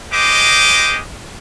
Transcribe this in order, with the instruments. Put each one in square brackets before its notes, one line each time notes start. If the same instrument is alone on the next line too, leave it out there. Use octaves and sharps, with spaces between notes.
[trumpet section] G#3 G4 C5 D#5 D6